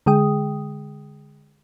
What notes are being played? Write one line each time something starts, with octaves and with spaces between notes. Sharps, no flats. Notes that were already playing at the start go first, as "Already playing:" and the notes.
D3 G#3 G#4 G5 D#6